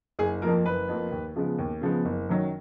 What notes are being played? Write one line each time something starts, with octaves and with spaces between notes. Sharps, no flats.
F#1 G#4
F2 F3 A#3 A#4
F#1 B4
F2 F3 A#3
D#2
C#3 F3 G#3 B3
D#2
C#3 F3 G#3 B3
F#1
F#2 D#3 F#3